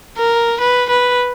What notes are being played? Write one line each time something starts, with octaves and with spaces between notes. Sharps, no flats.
A#4
B4
B4